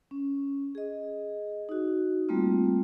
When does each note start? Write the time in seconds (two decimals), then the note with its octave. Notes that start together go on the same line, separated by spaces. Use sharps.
0.11 C#4
0.75 G#4 D#5
1.69 D#4 F#4
2.29 G3 A3 A#3 C4 F4